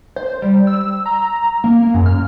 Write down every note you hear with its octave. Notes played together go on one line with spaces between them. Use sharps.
C5
G3
E6
A#5
A#3
F#2
F6